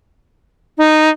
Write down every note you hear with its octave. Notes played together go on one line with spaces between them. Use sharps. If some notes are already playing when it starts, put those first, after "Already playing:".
D#4